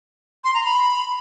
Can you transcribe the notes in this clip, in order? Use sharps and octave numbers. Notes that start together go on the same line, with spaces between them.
C6
A#5
B5